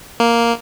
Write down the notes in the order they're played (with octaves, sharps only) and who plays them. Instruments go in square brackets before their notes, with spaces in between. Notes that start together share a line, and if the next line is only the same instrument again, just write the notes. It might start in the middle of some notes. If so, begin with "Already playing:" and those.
[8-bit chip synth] A#3